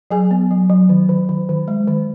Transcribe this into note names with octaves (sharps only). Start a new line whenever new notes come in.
F#3 G#4 G#5
B3
F#3
F#3
D#3
D#3
D#3
D#3
G#3
D#3